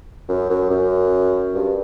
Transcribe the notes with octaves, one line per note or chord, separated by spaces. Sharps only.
F#2
F#2
F#2
G2